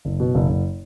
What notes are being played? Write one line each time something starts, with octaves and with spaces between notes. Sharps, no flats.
F#1
B2
F#1
F#1